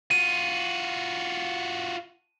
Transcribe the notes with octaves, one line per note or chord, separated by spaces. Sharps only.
F4 F#4 D#7